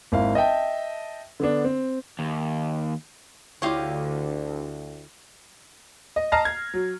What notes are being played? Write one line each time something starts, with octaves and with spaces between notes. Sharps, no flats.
G#1 A#3 E4 F5
D#5 E5 G5 A5
D3 B3 D4
C4
D#2
D2 D3 E4 F4 G4 C#5 D#5 F5
D#5
D#5 A5 A#5 F6 A#6 C7
G#6
F#3